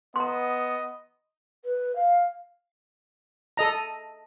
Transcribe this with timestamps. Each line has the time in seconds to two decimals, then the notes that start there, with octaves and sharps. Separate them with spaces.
0.16 B3 D#5 A#5 C6
1.64 B4
1.95 F5
3.57 A4 D#5 A#5